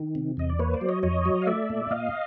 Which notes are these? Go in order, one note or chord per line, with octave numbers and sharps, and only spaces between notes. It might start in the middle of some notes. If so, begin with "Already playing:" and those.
Already playing: D#3
C3
E2 D#5
D5
A#3 B4 C#5
C5 D5
F#3
C#5 D#5
F2 C#5 D#5
F#3
F5
A3 D5 E5
A#2
A#2 D#5 F5